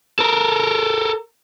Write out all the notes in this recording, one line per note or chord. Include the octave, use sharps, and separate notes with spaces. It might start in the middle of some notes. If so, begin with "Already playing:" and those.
A4 A#4